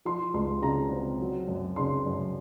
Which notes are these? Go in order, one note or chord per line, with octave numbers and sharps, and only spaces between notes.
F3 C6
C#2 C6
C#3 A#5
C4
F#3
F#2
C#3 C6
F#2